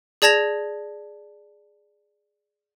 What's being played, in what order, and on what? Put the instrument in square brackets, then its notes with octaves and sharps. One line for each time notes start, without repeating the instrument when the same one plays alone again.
[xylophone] G#4 D5 A5 G#6 A#6 F7